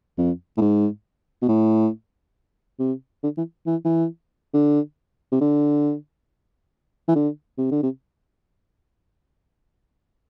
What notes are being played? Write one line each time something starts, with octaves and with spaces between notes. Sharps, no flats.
F2
A2
G#2
B2
A2
C3
D3
E3
E3
E3
D3
C3
D3
E3
D3
C3
D3
C3